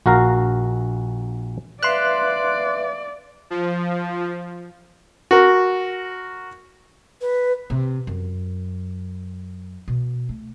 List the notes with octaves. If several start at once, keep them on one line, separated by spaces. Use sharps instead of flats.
A#1 F#4 A#4 F5 A#5
B4 D5 E5 F5 C6 F#6
F3
F#4 A#4
B4
C3
F#2
B2
A3